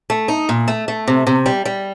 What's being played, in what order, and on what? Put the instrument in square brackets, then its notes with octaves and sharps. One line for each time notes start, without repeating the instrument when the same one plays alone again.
[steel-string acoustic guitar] A3
D#4
A#2
A3
A3
C3
C3
G3
G3